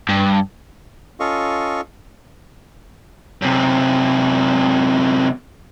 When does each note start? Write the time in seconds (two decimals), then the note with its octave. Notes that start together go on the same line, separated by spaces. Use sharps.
0.09 G2
1.20 C#4 F4 A4 D#5 F5 C#6
3.42 F#2 C3